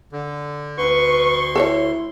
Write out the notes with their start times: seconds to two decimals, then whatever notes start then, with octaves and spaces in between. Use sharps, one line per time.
0.12 D3
0.78 D2 B4 C6 C#6
1.56 E4 A4 A#4 C#5